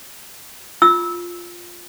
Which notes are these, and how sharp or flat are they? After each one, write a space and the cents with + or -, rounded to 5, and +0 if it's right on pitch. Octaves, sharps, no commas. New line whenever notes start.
F4 +0 E6 -20